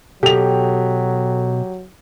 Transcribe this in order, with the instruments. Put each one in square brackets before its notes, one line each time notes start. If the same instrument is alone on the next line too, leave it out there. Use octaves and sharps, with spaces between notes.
[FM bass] B2 [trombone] F#3 [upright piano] G4 F7 [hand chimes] A4 G5